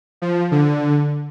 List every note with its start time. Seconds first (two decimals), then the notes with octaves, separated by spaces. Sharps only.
0.22 F3
0.51 D3